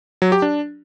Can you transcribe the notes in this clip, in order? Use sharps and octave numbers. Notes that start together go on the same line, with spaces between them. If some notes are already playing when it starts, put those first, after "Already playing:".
F#3
G4
D4